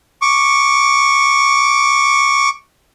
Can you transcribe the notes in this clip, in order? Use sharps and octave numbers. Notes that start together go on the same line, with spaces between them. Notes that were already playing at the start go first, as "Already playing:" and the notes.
C#6 D6